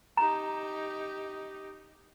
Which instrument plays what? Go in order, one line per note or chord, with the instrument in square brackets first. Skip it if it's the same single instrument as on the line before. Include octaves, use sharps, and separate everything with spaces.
[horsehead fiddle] D#4 G4 [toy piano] A#5